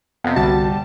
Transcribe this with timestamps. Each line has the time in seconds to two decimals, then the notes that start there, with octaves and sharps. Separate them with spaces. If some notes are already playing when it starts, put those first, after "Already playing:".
0.24 F2 C3 B3
0.36 G1 C2 D3 G3 F#4 A5